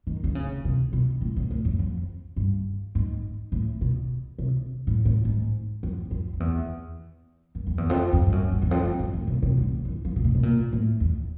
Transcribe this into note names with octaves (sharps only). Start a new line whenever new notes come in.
D#3
D3
C#3
C3
B2
A2
A#2
A2
F2
F2
G2
G#2
A2
B2
C3
A2
A2
G#2
F2
F2
F2
E2
F#2
F2
E2
F2
F2
G2
F#2
G2
E2
F2
E2
F2
A2
B2
C3
D3
D#3
E3
F3
C3
B2
B2
A#2
A2
E2